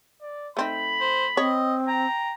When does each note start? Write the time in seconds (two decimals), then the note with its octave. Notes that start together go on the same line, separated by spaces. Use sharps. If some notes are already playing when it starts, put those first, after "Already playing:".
0.21 D5
0.57 A3 C4 D#4 B5
1.00 C5
1.37 C4 C#5 D#5
1.88 G5 A#5